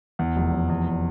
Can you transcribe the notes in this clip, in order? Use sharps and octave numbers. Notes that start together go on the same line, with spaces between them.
E2
F1
F1
E2